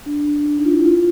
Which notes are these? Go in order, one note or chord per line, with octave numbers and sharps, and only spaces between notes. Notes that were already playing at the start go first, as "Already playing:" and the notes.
D4
D4
D4
D#4
F4
E4
F4